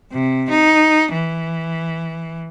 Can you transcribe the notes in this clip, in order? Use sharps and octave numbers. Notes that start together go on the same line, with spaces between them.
C3
D#4
E3